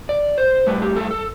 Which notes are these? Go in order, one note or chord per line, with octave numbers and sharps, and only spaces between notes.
D5
C5
A2 G3 B4
G4
A4
A4